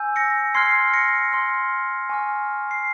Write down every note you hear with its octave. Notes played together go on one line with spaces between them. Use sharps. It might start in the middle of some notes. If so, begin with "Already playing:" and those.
Already playing: G#5 E6 G6
A#6 C#7
C6 F6 G#6 C7
A#6 C#7
C6 F6
G#5 C#6 F6
C7